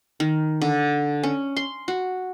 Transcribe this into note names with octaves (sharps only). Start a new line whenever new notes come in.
D#3
D3
C#4
C6
F#4